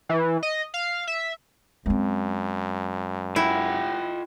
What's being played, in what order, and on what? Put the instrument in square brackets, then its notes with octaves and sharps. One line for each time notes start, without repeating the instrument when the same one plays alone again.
[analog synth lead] E3
D#5
F5
E5
[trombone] F#2 [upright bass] G#3 C4
[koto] E4 [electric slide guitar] F4 F#5 G5